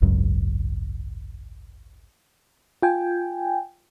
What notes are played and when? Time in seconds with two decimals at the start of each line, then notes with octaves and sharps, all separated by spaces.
0.02 G#1 C#2 F#2
2.82 F4 G5 G#5